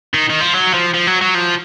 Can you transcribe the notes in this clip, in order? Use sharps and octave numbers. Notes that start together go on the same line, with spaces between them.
D#3
D#3
F3
F#3
F3
F3
F#3
F#3
F3